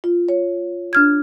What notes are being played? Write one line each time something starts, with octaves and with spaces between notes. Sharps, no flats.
F4
C#5
D4 F6 G#6